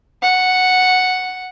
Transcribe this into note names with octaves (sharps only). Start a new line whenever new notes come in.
F#5